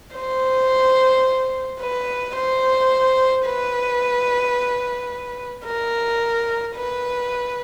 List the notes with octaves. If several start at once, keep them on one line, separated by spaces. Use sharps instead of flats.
C5
B4
C5
B4
A#4
B4